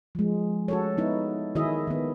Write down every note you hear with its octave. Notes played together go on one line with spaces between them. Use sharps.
F3 G#3
F#4 A4 C#5
B3 D#4 E4
D#3 E4 F#4 G#4 D#5 E5
D#3 B3